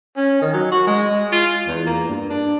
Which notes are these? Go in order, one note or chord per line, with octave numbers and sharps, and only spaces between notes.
C#4
D#3
F#3
F#4
G#3
F4
E2
A#3
G2
D4